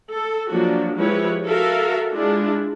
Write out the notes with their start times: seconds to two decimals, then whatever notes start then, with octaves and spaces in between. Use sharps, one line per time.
0.10 A4
0.50 F3 F#3 A#3 D4 F#4
0.96 F3 G#3 E4 G4 B4 C#5
1.46 F#4 A4 A#4 E5 F5
2.12 G#3 D4 E4 F4